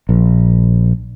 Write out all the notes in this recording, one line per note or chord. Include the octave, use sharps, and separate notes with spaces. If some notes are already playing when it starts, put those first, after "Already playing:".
A#1